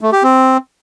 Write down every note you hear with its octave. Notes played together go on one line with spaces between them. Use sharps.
A3
G4
C4